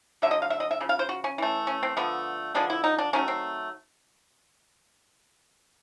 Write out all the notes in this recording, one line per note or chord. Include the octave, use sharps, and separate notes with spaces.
D3 F#3 A3 E5
D#5
F5
E5
D#5
E5
C#3 F3
F5
C5
F#4
C#4
E3 A3
C#4
C4
D3 F3 A3 B3
D3 F3 G#3 B3 D4
E4
D#4
D4
D#3 F#3 A3 C#4
C4